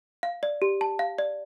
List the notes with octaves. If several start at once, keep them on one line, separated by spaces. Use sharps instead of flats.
F5
D5
G4
A5
F5
D5